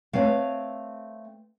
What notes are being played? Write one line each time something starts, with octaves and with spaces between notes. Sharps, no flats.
A3 C4 B4 C#5 F5